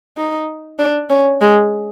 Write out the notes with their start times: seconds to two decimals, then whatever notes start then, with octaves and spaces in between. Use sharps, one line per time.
0.17 D#4
0.79 D4
1.09 C#4
1.41 G#3